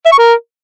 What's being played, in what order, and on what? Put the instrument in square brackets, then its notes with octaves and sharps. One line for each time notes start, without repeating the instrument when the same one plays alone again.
[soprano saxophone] E5
C#6
A#4